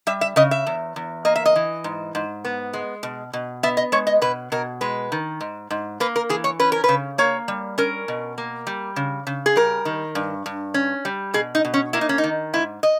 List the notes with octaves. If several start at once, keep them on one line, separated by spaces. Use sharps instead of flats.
G3 E5
E5
C#3 D#5
E5
E2
E2
A#3 D#5
E5
D#5
E3
G#2
G#2
B3
G#3
B2
B2
B3 E5
D#5
G#3 C#5
D#5
B2 B4
B2 A#4
G#3 B4
D#3
G#2
G#2
A#3 B4
A#4
E3 G#4
C#5
C#4 B4
A#4
C#3 B4
A#3 C#5
G3
C#4 A#4
B2
A#3
G3
C#3
C#3
G#4
G3 A#4
D#3
G2
G2
C#4
G3
B2 G#4
D#4
B2
C#4
A#3 E4
D#4
C#4
D#4
D#3
G#2 E4
D#5